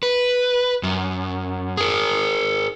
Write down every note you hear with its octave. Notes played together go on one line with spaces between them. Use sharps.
B4
F#2
G#4 A#4